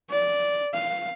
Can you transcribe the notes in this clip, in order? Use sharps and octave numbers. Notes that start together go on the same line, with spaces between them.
D5
F5